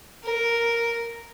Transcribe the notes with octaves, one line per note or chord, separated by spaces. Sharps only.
A#4